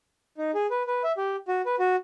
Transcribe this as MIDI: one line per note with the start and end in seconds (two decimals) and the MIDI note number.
0.38 0.51 63
0.54 0.67 68
0.71 0.83 71
0.87 1.03 71
1.04 1.12 76
1.17 1.36 67
1.48 1.62 66
1.66 1.76 71
1.79 1.96 66